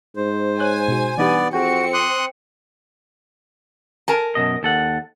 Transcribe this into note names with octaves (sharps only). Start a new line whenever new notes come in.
G#2 C5
C#5 G#5 F#6 G6
B2 F#4
G2 E3 B3 D#4 G4 D5
F2 C4 F#4 G#4 G5 C#7
C6 D6 D#6 F#6
A#4 G#5 A5
F#2 B2 D#5
D#2 A4 F#5